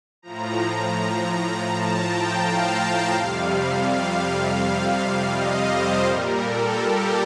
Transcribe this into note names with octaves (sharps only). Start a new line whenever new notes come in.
A2 F3 A#5
A5
G5
F5
F5
F2 C3 G3
F5
F5
D#5
C5
A#2 G3 A#4
A4
G4